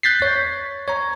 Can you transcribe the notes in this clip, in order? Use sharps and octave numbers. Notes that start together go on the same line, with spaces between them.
F#6 G6 A6 B6 C7
C#5
C#5 A#5